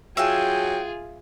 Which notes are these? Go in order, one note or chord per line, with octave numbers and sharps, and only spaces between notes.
F#3 F4 G#4 E5 F5 G5 G#5